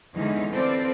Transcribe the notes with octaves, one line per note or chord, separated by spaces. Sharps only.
E2 D3 E3 G#3 C#4 D#4
C4 F4 A4 B4 D5